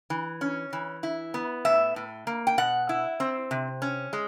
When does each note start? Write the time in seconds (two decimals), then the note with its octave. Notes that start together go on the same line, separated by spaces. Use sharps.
0.10 E3
0.41 C#4
0.73 E3
1.03 E4
1.34 B3
1.65 A2 E5
1.96 A2
2.27 A#3
2.47 G5
2.58 B2 F#5
2.89 E4
3.20 C4
3.51 C3
3.82 C#4
4.13 G#3